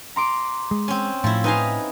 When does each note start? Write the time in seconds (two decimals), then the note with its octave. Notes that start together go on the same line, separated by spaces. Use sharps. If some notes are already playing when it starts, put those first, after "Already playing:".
0.16 A#5 C6 D6
0.71 G#3
0.88 C4 C#4
1.24 A2 F3 E4 C6
1.44 D#4 B4 D#5 F5 G#5